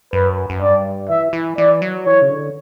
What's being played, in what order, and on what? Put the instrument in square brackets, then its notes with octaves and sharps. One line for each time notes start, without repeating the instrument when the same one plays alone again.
[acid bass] F#2 [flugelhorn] B4
[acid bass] F#2
[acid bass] G2 [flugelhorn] D5
[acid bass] E3 [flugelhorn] E5
[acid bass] E3
[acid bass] E3 [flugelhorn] D5
[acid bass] F#3
[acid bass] E3 [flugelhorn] C#5
[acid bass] C#3
D3